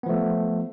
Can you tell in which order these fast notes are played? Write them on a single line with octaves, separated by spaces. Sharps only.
B3 F3 A3